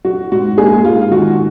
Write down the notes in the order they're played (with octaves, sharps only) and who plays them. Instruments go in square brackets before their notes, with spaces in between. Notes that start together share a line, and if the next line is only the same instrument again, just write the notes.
[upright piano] F#3 F#4
G#2 F#4
A#3 G#4
G#2 F4
F4
D#3 F#4
F#4